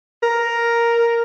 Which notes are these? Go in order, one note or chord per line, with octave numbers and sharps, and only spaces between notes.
A#4